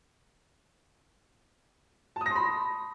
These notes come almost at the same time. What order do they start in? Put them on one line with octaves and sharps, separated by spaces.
A5 D#6 A#6 C6 B5